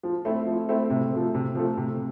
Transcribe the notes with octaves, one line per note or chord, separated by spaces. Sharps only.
F3
A3 C4 E4
F3
A3 C4 E4
C3
F3 A3
C3
F3 A3
C3